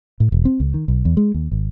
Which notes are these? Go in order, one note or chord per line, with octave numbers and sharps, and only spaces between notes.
A2
E1
C4
C#2
D#3
B1
E2
G#3
D#2
G#1